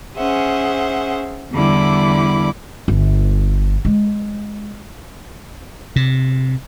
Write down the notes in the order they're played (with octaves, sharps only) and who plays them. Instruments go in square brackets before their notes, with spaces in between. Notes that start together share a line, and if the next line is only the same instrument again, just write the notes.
[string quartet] C#4 G#4 C5 E5 F#5
E2 D3 G3 E4 B5 D6
[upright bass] G1
G#3
[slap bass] C3